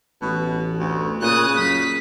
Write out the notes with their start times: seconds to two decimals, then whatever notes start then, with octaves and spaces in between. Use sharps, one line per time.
0.22 A1 B2
0.79 D2
1.22 A#2 C#3 D#6 F#6
1.57 F#2 B6